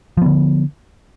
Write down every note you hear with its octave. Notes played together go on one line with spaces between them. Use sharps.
D3 F3 B3